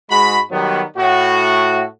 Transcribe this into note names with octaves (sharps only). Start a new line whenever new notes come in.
G#2 G#3 F#4 B5
D#3 F#3 G3 B3
A2 F#4